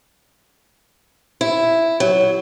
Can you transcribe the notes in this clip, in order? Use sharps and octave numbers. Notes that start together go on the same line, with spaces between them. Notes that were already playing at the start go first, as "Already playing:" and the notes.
E4
F#3